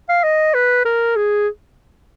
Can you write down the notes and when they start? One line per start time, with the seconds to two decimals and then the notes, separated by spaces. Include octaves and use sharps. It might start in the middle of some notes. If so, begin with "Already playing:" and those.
0.09 F5
0.23 D#5
0.54 B4
0.85 A#4
1.16 G#4